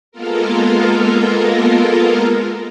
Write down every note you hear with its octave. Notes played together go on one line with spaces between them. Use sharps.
G#3 A#3 B3 F4 A4 A#4